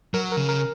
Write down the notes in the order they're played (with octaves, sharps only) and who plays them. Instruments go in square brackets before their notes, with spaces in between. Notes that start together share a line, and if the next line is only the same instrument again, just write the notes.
[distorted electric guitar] F#3 [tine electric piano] A#4
[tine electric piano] A#4
[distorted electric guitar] C#3
[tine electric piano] A#4